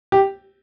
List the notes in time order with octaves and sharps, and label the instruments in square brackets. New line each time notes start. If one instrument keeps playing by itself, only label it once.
[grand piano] G4